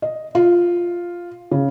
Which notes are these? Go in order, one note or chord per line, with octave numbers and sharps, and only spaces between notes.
D#5
F4
C#3